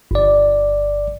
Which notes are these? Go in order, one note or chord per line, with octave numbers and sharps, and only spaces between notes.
G1 D5